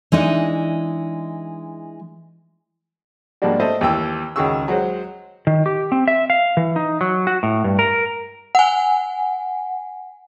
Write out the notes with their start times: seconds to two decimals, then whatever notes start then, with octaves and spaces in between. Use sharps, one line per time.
0.12 E3 G#3 D4 D#4
3.42 G#2 F3 G3 A#3 D4 F#4
3.60 A3 A4 C5 D#5 E5
3.81 D#2 E3 G5 E6
4.36 C#2 D#3 F#4 G#4 C#6 E6
4.68 F#3 G#3 F#4 C5
5.47 D#3
5.66 G4
5.92 C4
6.08 E5
6.30 F5
6.57 E3
6.76 D#4
7.01 F#3
7.27 F#4
7.43 A2
7.64 G2
7.79 A#4
8.55 F#5 G#5